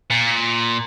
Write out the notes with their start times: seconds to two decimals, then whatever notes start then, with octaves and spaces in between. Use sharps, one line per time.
0.10 A#2